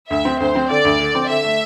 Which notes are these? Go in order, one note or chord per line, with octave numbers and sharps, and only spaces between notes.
D2 E5
C4
D2 C5
C4
D3 D5
D2
D3
C4
D3 E5
A3